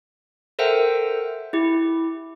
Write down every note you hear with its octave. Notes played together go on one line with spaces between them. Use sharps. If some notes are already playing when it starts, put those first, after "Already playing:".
A4 A#4 C5 E5 F#5 G5
E4 G4